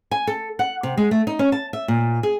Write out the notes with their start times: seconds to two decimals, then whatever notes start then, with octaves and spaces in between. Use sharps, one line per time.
0.11 G#5
0.27 A4
0.59 F#5
0.83 C3
0.97 G#3
1.11 A3
1.27 D#4
1.39 C#4
1.52 A5
1.73 E5
1.88 A#2
2.23 G#4